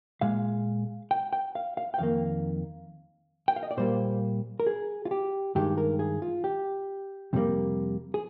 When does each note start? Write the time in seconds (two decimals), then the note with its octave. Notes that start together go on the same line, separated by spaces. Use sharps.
0.21 A#2 G#3 F5
1.11 G5
1.33 G5
1.55 F5
1.77 F5
1.94 G5
1.99 F2 D#3 A#3 F5
3.48 G5
3.56 F5
3.63 D#5
3.71 D5
3.77 A#2 G3 A#3 C5
4.60 A#4
4.67 G#4
5.05 F4
5.11 G4
5.55 G2 D#3 G#3 G4
5.78 A#4
5.99 G#4
6.22 F4
6.44 G4
7.33 F2 C3 D#3 G3 A#3
8.14 G#4